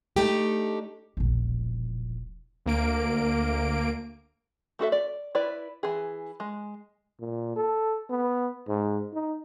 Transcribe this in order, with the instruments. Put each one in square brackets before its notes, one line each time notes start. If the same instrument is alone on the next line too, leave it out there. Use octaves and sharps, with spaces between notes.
[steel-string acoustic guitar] A3 D4 D#4 G4
[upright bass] E1 A#1
[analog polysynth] D2 A#3 D7
[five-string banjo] A3 F#4 A4 E5
D5
E4 B4 D5
E3 G#4
G#3
[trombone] A#2
A4
B3
G#2
D#4